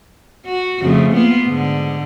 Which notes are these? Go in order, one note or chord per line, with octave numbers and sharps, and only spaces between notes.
F#4
F2 C#3 A3
A#3 B3 F4
G#2 D3